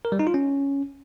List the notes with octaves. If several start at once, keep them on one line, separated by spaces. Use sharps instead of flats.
A#4
G3
D#4
F4
C#4